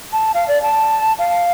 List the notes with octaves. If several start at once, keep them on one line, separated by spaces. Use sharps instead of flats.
A5
F5
D5
A5
F5